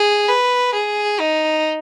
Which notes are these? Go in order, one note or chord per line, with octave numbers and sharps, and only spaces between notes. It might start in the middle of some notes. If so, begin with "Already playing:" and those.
Already playing: G#4
B4
G#4
D#4